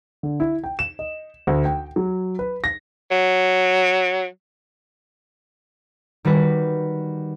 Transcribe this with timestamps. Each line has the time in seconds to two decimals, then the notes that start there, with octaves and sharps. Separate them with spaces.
0.23 D3
0.40 E4
0.64 G5
0.79 E7
0.99 D#5
1.47 D2
1.65 G5
1.96 F#3
2.39 B4
2.64 A#6
3.11 F#3
6.25 D#3 G3 F#4 B4